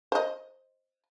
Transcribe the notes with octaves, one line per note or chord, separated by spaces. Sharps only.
C5 D#5